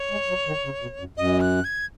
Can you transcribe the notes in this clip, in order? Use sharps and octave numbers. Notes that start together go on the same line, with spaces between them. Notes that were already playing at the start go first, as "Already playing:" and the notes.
Already playing: C#5
G#3
F#3
D#3
C#3
B2
F#2
F#2 D#5
F#6
G#6